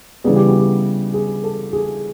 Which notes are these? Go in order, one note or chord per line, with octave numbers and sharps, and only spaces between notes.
C#3 E3 G3 B3 G#4
G4
F#4
G4
G#4
A4
G#4